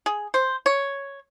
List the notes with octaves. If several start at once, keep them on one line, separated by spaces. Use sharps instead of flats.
G#4
C5
C#5